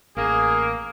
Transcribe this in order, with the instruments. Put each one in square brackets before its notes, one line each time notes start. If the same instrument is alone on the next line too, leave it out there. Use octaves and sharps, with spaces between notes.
[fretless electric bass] A1 [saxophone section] A#3 [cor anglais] G#4